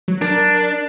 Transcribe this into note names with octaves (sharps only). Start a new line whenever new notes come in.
F#3
D4 A#4